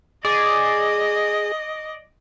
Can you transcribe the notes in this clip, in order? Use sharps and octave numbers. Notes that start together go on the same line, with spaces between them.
G#4 D5 D#5